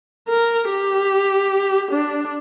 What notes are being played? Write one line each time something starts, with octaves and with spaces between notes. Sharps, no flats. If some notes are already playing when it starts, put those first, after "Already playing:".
A#4
G4
D4